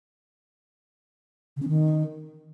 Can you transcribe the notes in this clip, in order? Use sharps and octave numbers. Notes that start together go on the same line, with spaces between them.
C#3
C#4
D#3